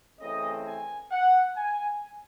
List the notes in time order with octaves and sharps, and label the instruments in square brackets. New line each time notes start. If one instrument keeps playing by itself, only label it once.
[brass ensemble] C#3 E3 A3 C4 D#5
G#5
F#5
G#5